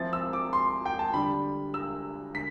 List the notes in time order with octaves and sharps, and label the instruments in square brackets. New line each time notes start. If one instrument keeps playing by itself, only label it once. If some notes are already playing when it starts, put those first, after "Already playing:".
Already playing: [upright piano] F3 C4 E4 A6
E6
D6
C6
G5
A5
D3 G3 D4 B5
E6
D3 B6